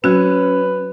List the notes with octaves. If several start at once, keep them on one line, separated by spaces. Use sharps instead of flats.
F#3 C#4 F#4 B4